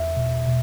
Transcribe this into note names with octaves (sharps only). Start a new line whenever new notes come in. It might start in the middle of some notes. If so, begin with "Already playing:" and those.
Already playing: E2 E5
B2
B2